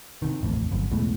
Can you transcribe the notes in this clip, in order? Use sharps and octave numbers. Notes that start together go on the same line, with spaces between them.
C3 D#3
D#1 A1 F2
G1 F#2
B1 E2 A2 G#3